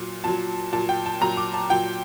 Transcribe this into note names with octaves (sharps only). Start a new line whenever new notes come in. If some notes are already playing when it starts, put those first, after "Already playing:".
Already playing: A#2 F#3
A#2 F#3 A5
A#2 F#3 A5
G5
A5
A#2 F#3 A#5
D6
A5
A#2 F#3 G5